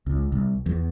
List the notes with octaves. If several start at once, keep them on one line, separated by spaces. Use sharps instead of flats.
C#2
C2
E2